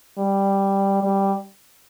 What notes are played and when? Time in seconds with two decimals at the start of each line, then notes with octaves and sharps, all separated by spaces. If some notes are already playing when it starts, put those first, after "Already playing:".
0.18 G3
1.03 G3